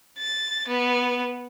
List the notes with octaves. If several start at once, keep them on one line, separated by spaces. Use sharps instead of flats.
A6
B3